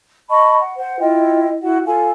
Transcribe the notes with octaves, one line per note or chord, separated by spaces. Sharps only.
D#5 A5 B5 C#6
F#5
C5 F#5
E4 F4 D#5 G5
E4 F#4 F#5
F4 A4 F5 G#5